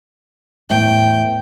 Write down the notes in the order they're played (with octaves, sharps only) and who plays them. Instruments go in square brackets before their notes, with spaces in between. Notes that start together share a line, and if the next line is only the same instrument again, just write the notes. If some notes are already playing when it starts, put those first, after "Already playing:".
[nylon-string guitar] E2 A2 E5 [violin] G5